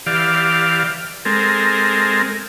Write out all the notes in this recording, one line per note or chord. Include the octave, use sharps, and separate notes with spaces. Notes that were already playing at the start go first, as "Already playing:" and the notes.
E3 G4 D5 F5
G#3 C4 A4 A#4